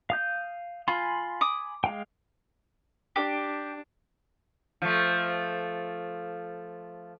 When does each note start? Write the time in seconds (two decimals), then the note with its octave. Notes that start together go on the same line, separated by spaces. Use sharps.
0.10 F5 D#6 G6
0.88 F4 G#5 B5 C6
1.41 D6 D#6
1.84 G#3 F5 G5
3.16 D4 G4
4.82 F3 A3